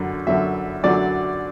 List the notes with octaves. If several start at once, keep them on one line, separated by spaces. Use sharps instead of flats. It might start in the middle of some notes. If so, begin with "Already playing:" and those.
Already playing: F#2 D3 F#3
F#2 D3 F#3 E5
F#2 D3 F#3 D5